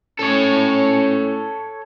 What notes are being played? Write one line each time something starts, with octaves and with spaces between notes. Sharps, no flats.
A2 C#4 A4 C#5